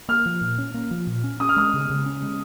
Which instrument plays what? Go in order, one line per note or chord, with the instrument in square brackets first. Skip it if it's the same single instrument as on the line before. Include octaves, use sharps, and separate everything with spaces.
[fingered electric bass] A#3 [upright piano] F6
[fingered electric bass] F3
A#2
C#4
A#3
F3
A#2
C#4
[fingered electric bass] C#4 [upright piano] D#6
[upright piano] F6
[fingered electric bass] G#3 [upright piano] D#6
[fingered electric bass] C#3
C#3
C#4
G#3